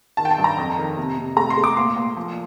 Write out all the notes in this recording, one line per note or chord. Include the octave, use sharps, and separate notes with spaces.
D#3 A5
G5
A5
G2
A#5
F2
D#3
C3
C3
A3 A#5
C6
A3
D6
A#2 C6
A#2
F3